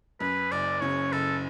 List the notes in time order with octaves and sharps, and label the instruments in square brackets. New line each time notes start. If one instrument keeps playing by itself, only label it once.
[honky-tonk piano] F#2 [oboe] B4
[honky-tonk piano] F#1 [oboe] D5
[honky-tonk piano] C#3 [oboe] C#5
[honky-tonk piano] F#1 [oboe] A4